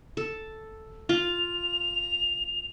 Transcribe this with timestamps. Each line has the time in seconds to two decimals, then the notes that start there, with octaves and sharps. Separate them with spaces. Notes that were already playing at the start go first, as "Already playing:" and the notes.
0.17 A4
1.09 F4 F7